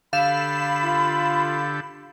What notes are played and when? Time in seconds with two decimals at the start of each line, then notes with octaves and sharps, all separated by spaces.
0.13 D3 G4 A4 F5 B5 E7
0.84 F4